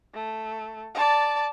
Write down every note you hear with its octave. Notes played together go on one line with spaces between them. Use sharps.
A3
D5 A5